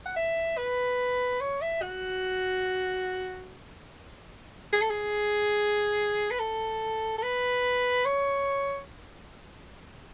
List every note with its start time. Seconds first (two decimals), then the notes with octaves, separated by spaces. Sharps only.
0.06 F#5
0.16 E5
0.57 B4
1.41 C#5
1.61 E5
1.82 F#4
4.73 G#4
4.82 A4
4.90 G#4
6.31 B4
6.39 A4
7.18 A4
7.23 B4
8.05 C#5